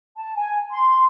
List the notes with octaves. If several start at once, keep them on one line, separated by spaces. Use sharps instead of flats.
A5
G#5
C6